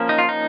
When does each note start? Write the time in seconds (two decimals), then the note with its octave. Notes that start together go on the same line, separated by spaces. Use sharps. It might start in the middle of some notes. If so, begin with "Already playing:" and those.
Already playing: F3 A#3 C#4
0.09 D#4
0.18 F4
0.29 D#4